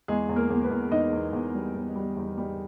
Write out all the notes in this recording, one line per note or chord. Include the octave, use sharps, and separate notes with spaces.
E2 G#3 G#4
E2
A#3 A#4
E2
B3 B4
E2
E2 D#4 D#5
E2
E2
G3
E2
G3
E2
G3